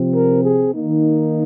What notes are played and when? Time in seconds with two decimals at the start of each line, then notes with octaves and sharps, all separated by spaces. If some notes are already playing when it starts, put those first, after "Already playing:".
Already playing: C3 F3 C4
0.14 A#4
0.44 G#4
0.74 D#3 A#3 D#4